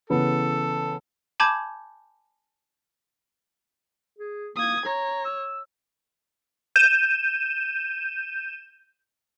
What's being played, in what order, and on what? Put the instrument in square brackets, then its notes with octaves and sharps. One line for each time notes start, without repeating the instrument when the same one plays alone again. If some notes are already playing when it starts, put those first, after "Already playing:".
[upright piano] C#3 E3 B3 [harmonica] A4
[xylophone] G#5 A5 B5 D6 G6 G#6
[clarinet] G#4
[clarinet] A#3 [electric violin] D#6 G#6
[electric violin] C#5 [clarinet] A#5
[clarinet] E6
[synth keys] G6 D#7 E7